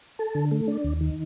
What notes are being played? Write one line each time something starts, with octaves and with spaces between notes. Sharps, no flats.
A4
D3
A3
D4
D#2
D#3